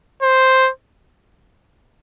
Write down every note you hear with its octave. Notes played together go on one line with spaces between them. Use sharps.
C5